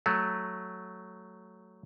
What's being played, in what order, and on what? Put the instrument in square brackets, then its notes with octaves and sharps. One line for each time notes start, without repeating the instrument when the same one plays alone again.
[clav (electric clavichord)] F#3 A3